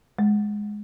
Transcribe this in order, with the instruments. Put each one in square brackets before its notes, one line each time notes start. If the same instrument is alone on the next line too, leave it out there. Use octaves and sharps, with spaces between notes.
[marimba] G#3